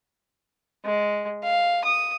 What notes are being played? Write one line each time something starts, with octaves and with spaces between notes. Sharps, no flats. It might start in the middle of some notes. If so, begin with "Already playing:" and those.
G#3
F5
D#6